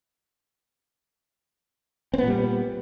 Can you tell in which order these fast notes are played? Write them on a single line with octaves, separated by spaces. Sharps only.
C4 B3 A#2 G3